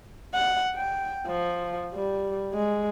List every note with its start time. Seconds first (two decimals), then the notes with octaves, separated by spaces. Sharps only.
0.34 F#5
0.75 G5
1.27 F3
1.94 G3
2.54 G#3